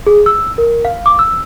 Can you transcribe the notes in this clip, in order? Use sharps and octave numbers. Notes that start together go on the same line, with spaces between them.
G#4
E6
A#4
F5
D6
E6